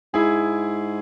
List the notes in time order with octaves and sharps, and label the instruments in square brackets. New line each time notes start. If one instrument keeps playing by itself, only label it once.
[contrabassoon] G#2 [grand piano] E4 G#4